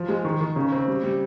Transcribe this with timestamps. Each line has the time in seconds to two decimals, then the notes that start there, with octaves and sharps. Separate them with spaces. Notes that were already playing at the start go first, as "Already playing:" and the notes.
Already playing: F3
0.09 G#3
0.25 D#3
0.40 D#3
0.56 C#3
0.72 C4
0.87 G3
1.03 G3